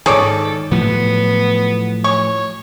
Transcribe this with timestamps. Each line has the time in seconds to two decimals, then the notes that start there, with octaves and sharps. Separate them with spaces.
0.06 G#2 D#3 G#4 A4 C#5 D5
0.72 A2 F3 F#3 B3
2.04 C#5 C#6